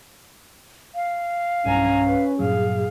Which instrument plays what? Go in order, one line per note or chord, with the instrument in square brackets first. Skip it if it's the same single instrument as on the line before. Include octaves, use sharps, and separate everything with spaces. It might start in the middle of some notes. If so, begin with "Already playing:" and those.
[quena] F5
[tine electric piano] B1 G2 [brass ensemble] C#4 [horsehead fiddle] G#5 A#5
[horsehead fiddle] B4
[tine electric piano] G2 A#2 F#3 [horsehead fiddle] G#4 F5